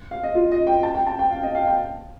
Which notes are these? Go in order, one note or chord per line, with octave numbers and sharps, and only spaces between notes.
F5
D#5
F4
D#5
G5
A5
G5
A5
G5
F5
D#5
F5
G5